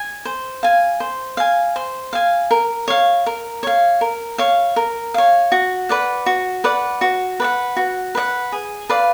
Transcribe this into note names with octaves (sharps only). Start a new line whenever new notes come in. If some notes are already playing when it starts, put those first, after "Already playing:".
Already playing: G#5
C5
F5 G#5
C5
F5 G#5
C5
F5 G#5
A#4
C#5 F5
A#4
C#5 F5
A#4
C#5 F5
A#4
C#5 F5
F#4
B4 D5 F#5
F#4
B4 D5 F#5
F#4
B4 D5 F#5
F#4
B4 D5 F#5
G#4
B4 D5 F5